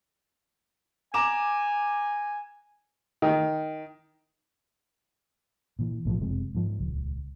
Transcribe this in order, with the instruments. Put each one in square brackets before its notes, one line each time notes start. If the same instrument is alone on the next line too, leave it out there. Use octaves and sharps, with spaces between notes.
[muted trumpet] G#5 [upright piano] A#5 D6 E7
[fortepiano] D#3
[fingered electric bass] A#2 E3
B1 A2 D3 F3
F#1 F2 C3 G#3
G#2 F3
D#1 C#2